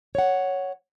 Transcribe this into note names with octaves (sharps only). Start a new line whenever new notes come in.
C#5 F#5